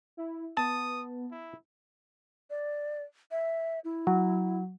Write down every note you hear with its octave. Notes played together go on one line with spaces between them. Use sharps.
E4
B3 A5 D#6
E4
D5
E5
E4
F#3